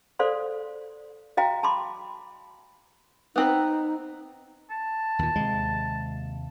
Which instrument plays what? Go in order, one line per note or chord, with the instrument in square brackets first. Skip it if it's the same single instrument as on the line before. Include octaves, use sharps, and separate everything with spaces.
[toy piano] A4 C5 D5 F5 C6
F#4 D#5 F5 G5 A#5
A5 B5 C6 D6
[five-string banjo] B3 C4 B4 [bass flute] D#4
[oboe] A5
[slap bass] D#2 A#2
[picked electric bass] D#2 C3 [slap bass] G#3